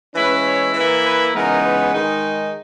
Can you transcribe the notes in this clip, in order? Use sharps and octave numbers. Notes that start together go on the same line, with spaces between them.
E3 G#3 C#4 E4 B4
C#5
E3 A#3 E4 B4
B4
C#3 E3 G#3 B3 D#4 A#4
B4
D#3 G#3 D#4